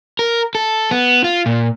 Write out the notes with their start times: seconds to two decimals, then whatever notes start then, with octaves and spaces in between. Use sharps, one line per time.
0.19 A#4
0.55 A4
0.91 B3
1.24 F4
1.46 A#2